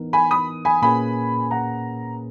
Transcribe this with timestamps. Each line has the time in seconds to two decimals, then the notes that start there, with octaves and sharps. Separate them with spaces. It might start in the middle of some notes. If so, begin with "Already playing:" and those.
Already playing: E3 B3 D#4 A#4
0.13 G#5 B5
0.31 B5 D#6
0.65 G#5 B5
0.82 A#2 A#3 C#4 G#4 B4 G#5 B5
1.51 F#5 A#5